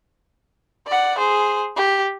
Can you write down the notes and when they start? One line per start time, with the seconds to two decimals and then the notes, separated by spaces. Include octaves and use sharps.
0.87 D5 F#5
1.18 G#4 C5
1.76 G4